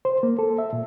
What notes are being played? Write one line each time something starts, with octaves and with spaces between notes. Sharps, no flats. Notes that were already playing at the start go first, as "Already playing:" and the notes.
C5
A#3
A4
E5
A#2